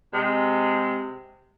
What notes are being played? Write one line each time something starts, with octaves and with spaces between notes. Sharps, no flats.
C3 G#3